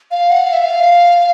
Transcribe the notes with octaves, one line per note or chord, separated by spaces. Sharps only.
F5
F#5
F5
E5
F5